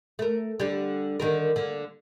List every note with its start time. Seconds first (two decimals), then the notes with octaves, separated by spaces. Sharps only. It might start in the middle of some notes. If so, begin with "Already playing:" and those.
0.19 A3 A#4
0.60 D3 G3
1.20 D3 D#3 A#4
1.56 D3 A#3